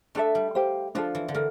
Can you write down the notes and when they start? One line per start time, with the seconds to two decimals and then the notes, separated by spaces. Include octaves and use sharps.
0.15 A3 D4 A4 E5
0.35 G3
0.55 G4 C5 F5
0.95 F3 D4 F4 A4
1.15 E3
1.28 D3
1.34 E3 A#4